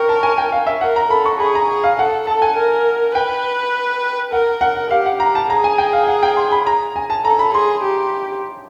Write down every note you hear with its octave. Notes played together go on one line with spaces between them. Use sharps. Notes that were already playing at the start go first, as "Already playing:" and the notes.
Already playing: A#4 G5 C#6
A5
G#5
G5
F5
E5
A#4 F#5
A#5
A4 B5
C#6
G#4 B5
A#5
G#4
F5
A4 F#5
A4 A5
G#5
A#4
B4 G5
A#4 F#5
F#5
G4 F5
F#5
A#5
A5
G#4 A#5
G#5
G5
F5
F#5
G5
C6
B5
A#5
G#5
A5
A4 A#5
B5
G#4 C6
G4